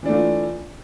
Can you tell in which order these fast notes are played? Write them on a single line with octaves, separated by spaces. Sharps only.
E3 D4 A3 F4